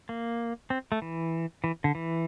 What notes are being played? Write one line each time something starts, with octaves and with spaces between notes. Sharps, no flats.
A#3
C4
A3
E3
E3
D3
E3